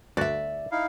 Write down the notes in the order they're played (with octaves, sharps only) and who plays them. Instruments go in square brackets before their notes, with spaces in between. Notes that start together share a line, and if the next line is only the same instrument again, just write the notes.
[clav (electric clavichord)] D2 F#4 [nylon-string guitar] D5 E5
[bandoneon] D#4 E4 F5